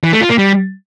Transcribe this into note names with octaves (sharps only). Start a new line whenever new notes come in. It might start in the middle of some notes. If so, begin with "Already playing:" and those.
E3
A3
F4
A#3
G3